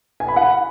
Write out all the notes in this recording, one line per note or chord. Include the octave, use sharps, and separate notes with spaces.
G#5
B5
F#5